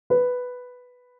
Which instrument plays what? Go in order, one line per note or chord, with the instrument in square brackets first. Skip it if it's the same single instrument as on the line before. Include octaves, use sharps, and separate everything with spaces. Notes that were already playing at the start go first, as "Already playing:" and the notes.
[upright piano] B4